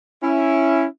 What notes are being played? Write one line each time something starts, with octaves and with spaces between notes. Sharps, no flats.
C#4 E4